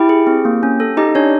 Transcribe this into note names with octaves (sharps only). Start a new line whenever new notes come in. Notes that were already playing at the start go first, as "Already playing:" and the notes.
Already playing: E4 G4 G5
G#4
C4
A#3
C#4
A4
D#4 G4 D#5
C#4 D4 C#5